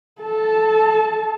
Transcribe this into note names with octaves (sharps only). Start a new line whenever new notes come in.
A4 A5